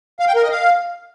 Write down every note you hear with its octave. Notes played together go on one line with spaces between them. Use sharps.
F5
G5
A#4
D#5
F5